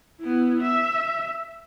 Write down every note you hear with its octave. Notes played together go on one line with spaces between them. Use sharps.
B3 E4
E5